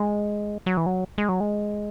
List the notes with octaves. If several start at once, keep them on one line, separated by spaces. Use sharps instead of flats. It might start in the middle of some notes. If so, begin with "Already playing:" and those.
Already playing: G#3
F#3
E3
F#3
G#3
F#3
G#3